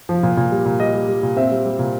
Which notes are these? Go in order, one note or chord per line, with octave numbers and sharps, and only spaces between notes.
F3
A#2
A#2
G3
A#2
G3 D#5
G3
G3
A#2
C4 E5
G3
G3
A#2